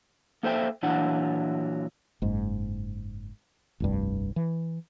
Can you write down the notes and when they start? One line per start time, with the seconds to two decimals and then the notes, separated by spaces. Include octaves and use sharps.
0.43 A#3 A4 C5 E5 G5
0.83 A#2 E3 F#3 D4 E4 F#5
2.22 F#1 G#2
3.80 F1 C2 G2
4.36 E3